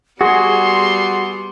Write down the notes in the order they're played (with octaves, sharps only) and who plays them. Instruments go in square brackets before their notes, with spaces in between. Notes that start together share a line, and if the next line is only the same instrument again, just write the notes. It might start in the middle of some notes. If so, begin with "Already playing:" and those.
[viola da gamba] G3 B3 [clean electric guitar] F#4 [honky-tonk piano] G#4 [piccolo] C6